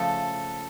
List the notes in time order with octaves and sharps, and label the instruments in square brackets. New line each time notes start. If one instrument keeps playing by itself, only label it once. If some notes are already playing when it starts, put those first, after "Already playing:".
Already playing: [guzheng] C#3 F3 A3 [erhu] A4